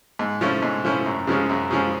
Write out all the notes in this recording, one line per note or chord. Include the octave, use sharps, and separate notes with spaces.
G#2
F3 A3 C#4 E4
G#2
F3 A3 C#4 E4
F#2
C#3 F3 G#3 C#4
F#2
C#3 F3 G#3 C#4